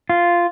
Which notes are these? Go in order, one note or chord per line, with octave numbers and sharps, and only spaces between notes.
F4